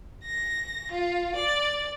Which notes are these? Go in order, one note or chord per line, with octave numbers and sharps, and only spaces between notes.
A#6
F4
D5